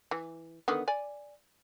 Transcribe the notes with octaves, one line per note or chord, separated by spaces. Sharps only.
E3
D3 D#3 B3
D5 G#5